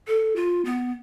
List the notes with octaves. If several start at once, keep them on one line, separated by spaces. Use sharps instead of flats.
A4
F4
B3